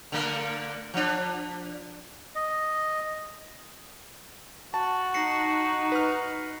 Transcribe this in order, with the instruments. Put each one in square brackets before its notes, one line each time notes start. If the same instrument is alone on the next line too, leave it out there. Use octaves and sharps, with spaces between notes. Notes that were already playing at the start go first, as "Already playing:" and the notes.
[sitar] D3 A3 A#4
F3 D4
[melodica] D#5
[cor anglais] F#4 [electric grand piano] A5
[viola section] D#4 [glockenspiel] A#6 C7 C#7
[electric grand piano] B4 F6